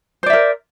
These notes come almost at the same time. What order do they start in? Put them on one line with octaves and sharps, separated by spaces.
C5 D5 E5 A#4